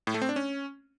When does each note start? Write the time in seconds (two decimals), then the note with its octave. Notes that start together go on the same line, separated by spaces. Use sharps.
0.07 A2
0.14 A3
0.22 C4
0.29 D4
0.36 C#4